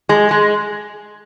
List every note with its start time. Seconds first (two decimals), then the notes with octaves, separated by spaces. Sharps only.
0.09 G#3
0.31 G#3